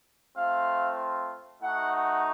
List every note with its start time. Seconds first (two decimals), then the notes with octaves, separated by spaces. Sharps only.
0.36 A3 C4 F4 F5
1.62 A3 D#4 F#4 F#5
1.94 F#5